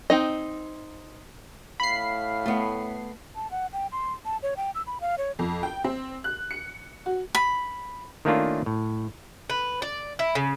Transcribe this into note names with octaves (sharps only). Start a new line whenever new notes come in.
C4 D#4 D#5
A2 F5 B5 C7
A3 B3
A5
F#5
G5
C6
A5
C#5
G5
E6
B5
F5
C#5
F2
G5
C4
F#6
C#7
F#4
B5
D#3 A3 A#3 C#4 D4 F4
A2
B4
D5
E4
C#3